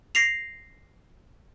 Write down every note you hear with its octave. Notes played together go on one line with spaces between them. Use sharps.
A#6 C7 F7